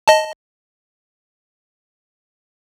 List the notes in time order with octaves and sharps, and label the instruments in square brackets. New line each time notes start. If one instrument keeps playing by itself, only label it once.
[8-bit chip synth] D#5 A5